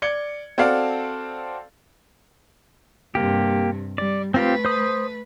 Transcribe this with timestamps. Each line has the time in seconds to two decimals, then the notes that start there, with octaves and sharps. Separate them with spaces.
0.02 D5 G#6 C#7 G7
0.58 C4 F#4 A4 D5 F5 A5
3.15 G2 C3 A#3 G4
3.98 G3 D5
4.34 A3 C4 F4 G4 B4
4.65 C5 D#6